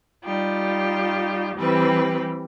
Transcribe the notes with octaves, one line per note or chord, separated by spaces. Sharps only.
G3 D#4 F4 G4
E3 G3 C4 G4 B4